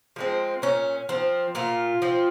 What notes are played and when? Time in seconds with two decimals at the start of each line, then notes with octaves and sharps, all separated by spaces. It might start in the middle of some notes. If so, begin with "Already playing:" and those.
0.16 F3 G#3 C4
0.62 A#2 C#4
1.09 F3 C4
1.55 A#2 F4
2.02 F3 C4